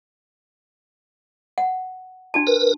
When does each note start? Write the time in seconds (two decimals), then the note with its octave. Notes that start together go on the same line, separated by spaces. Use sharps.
1.58 F#5
2.34 D4 F#4 A5
2.47 A#4 B4